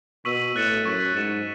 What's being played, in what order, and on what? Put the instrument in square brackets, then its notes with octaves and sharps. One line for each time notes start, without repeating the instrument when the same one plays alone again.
[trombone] B2 [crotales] C#6 E6 B6 D#7 F#7
[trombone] A2 [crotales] F#6 A6 C#7 E7
[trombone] F#2 [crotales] C#6 G#6 B6 F#7
[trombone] G#2 [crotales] F#6 A6 C#7 E7